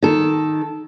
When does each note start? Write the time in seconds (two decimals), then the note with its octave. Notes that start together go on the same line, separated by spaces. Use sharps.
0.02 D#3 A4